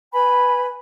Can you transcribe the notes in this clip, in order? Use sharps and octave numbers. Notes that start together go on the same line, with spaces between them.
B4 G#5 B5